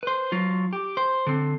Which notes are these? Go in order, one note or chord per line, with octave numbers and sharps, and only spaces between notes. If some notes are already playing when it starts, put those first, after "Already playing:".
B4 C5
F#3 F4
G4
C5
D3 C4